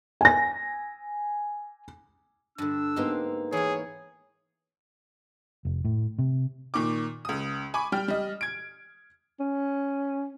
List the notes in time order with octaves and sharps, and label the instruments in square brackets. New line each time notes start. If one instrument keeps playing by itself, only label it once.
[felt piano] G#5 A#6
[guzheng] G2 D3 [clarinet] D4 [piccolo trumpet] E6
[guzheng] G#2 G4 C5 [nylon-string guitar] A#3 B3 D#4
[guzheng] E3 F5 [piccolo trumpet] G#4 [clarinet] C#5
[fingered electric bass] F1
A2
C3
[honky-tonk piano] A#2 D#3 C#6 D6
C#2 D#6
G#5 B5 C#6 D6
G3 G5 F6
G3 D#5
G#6 D7
[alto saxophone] C#4